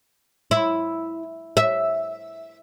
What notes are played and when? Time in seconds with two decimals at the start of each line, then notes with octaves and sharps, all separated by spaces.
0.51 E4
1.57 E5